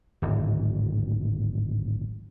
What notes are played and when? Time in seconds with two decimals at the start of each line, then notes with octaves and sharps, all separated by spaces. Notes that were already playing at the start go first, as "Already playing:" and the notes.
0.22 D1 G#1